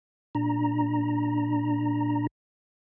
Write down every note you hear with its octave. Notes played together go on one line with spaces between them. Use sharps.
A#2 D4 A#5